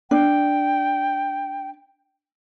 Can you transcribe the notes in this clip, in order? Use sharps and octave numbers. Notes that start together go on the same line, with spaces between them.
D4 G5